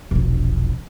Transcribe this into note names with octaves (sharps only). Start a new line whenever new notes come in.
E1 A#1